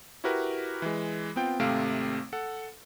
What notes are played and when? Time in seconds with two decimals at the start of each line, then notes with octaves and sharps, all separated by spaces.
0.24 E4 F#4 G4 A#4 B4
0.82 E3 G#3
1.36 B3 C4 F4 G5
1.59 G#1 C3 A3 C4 F5 D7
2.33 A4 F#5